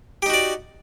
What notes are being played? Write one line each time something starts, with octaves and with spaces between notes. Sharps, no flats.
D#4 F#4 G4 D5